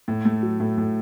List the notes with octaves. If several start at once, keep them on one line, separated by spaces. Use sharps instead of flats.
A2
A3
F#3
A2
A2